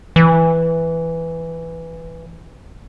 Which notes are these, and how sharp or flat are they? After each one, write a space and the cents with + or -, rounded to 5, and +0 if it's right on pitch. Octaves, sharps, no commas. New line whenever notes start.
E3 +0